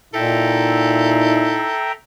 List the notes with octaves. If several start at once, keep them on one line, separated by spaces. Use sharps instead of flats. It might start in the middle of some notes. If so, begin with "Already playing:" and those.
A#2 D#4 E4 A4 E5 G5 A#5